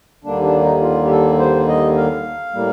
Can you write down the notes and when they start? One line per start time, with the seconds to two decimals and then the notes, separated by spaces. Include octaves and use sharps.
0.24 D#2 D3 G3 A#3 D4
0.43 D4
0.62 D#4
0.82 F4
1.05 G4
1.11 A4
1.39 C5
1.68 D#5
1.96 F5
2.54 A2 G3 A#3